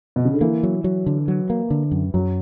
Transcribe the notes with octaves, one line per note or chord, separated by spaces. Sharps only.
B2
C#3
D3
E3 A#3
F#3
F#3
D3
F#3
A#3
D3
F#2
F#2 F#3